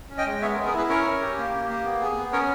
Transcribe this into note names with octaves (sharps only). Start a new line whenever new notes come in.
C#4
D#5 G5
G#3
B3 C#5 E5
A#4
G#4
A#4
E4 G#4 B4
C#4 A#4 C#5
C#4
G4
A#3
G4
A#3
B3
G#4
B3
C#4 A#4 C#5